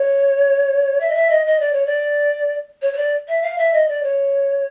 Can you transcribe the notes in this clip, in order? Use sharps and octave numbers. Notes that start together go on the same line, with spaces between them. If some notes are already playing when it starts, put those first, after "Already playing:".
Already playing: C#5
E5
D#5
E5
D#5
D#5
D5
C#5
D5
C#5
C#5
D5
E5
F5
E5
D#5
D5
C#5